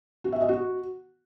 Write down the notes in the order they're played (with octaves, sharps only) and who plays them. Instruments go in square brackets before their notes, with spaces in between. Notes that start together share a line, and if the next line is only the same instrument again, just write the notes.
[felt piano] F#4
E5
D#5
F#4